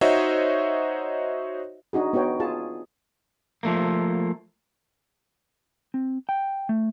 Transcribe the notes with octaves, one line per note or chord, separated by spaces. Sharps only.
D#4 F#4 C5 C#5 D#5 E5
D4 D#4 F#4 G#4
B3 D#4 F#4 C#5 G5
F4 G#4 A5
F3 A3 A#3
C4
G5
A3